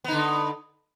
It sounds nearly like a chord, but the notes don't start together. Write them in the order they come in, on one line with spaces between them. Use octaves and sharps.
B3 D#4 D3